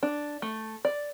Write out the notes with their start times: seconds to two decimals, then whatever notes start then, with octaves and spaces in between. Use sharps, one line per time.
0.03 D4
0.42 A3
0.85 D5